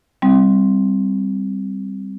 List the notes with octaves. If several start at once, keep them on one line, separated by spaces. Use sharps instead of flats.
G3 C4